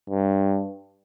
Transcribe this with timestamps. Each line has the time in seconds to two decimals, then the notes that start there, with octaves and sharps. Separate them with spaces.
0.10 G2